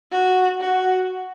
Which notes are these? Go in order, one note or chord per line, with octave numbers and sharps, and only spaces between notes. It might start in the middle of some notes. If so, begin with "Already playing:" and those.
F#4
F#4